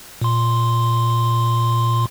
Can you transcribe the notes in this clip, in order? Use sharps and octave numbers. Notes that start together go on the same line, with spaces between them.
A#2 C6